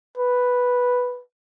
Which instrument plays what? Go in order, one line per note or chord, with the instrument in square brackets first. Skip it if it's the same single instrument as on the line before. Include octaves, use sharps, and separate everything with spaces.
[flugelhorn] B4